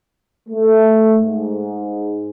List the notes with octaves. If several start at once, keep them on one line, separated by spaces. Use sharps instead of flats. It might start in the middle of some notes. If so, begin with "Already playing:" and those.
A3
G#2